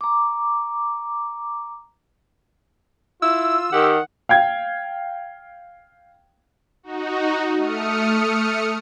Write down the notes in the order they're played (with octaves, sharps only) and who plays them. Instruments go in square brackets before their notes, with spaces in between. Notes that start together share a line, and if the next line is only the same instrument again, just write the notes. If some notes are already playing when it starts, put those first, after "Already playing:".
[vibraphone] A#5 D6
[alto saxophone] E4 [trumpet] F4 [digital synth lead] E6
[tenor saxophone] D#3 [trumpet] G4 [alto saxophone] F#5
[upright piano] F5 G5 G#6
[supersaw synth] D#4 F#4
A3 D#6 F6 C#7